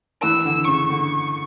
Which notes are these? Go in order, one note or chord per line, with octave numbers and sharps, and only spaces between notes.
E3 E6
D3
C#3 C#6
D3